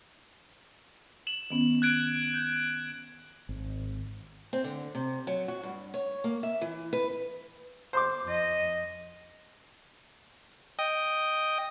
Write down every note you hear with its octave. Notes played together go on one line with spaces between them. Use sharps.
E7 F#7
D#3 B3 C#4
F#6 G#6 D7
G6
G#1
C4
D3
C3
F#3
F#4
G2
C#5
A#3
E5
E3
B4
C5 C6 D6
F2 D#5
D#5 G5 D#6